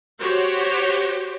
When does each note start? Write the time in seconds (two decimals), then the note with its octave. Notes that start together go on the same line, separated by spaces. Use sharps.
0.19 F#4 G4 C5 C#5